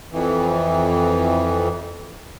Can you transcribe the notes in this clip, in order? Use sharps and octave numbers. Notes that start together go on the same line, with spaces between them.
F2 E3